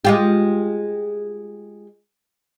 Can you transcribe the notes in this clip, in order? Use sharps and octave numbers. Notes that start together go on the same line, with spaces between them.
G#3 F4 G4